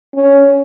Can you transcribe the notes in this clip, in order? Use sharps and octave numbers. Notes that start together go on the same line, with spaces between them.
C#4